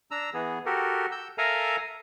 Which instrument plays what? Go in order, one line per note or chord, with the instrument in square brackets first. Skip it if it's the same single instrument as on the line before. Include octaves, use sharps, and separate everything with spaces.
[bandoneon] D4 A#5 E6
E3 B3 G#4
F#4 G4 A4 A#4
E6 G6
A4 A#4 E5 F5 G#5 A#5